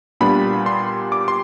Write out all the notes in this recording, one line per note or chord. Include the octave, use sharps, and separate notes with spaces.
A#2 G3 B3 D4 B5
C6
D6
C6